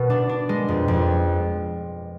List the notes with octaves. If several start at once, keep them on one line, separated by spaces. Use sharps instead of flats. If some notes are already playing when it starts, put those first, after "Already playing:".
Already playing: B2 B3
D4
D4
G#3
F2
F2